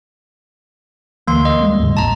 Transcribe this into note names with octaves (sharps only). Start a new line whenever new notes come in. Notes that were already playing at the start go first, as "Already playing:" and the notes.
D2 E3 A#3 C6
D#5
G3 G#3 B3
D#2 G#2 C#3
A1 F2 A5 A#5